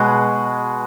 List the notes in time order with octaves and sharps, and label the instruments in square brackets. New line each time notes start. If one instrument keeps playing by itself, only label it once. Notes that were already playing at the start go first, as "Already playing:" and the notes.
Already playing: [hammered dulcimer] B2 G#3 F#4